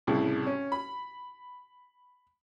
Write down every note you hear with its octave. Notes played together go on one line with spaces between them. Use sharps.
C2 A2 C#3
C#4
B5